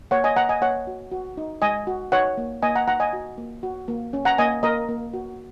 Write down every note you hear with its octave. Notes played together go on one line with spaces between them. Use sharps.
A#3 C#5 F#5
D#5 G#5
A#3 F#5 A#5
D#5 G#5
A#3 C#5 F#5
F#4
F#4
D#4
G#3 D#5 G#5
F#4
D#4 C#5 F#5
A#3
A#3 D#5 G#5
F#5 A#5
D#4 F#5 A#5
D#5 G#5
F#4
A#3
F#4
A#3
C#4
F#5 A#5
A#3 D#5 G#5
A#3 A#4 D#5
A#3
F#4